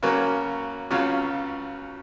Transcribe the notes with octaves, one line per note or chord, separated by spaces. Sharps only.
C#3 F#3 A#3 C#4
C#2 C#3 F#3 C#4 F4